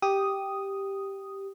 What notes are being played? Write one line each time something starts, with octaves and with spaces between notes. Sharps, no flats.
G4 D#6